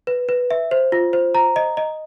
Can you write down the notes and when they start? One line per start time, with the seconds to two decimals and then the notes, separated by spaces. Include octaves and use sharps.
0.07 B4
0.29 B4
0.51 E5
0.71 C5
0.92 F4
1.13 C5
1.35 A#5
1.56 D#5
1.77 D#5